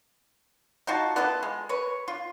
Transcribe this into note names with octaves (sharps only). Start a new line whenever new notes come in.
D#4 F4 F#4 A5
B3 E4 F4 A4
G#3
B4 C#5
F4